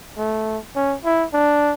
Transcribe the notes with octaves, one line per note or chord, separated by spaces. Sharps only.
A3
C#4
E4
D4